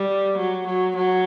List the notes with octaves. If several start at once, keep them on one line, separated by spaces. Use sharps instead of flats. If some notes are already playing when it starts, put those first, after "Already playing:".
Already playing: G3
F#3
F#3
F#3